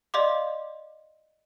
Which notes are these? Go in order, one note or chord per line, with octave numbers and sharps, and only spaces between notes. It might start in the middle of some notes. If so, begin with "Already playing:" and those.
D5 D#5 F5 C6 D6